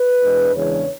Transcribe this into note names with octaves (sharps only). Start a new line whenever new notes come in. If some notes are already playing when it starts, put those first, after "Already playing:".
Already playing: B4
E2 B2 G#3 D4
E2 C#3 E3 G#3 D4 C#5